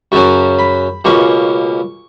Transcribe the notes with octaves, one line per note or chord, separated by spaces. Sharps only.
F#2 C#3 F#3 C#4 C#6
B5
C#2 B2 A#3 C#4 C#6